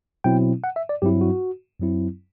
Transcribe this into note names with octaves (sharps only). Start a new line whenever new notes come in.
B2 F#3 C4 E4 G5
F#5
E5
D5
G2 F#3 C4 E4 G4
F#4
F#2 F#3 C4 E4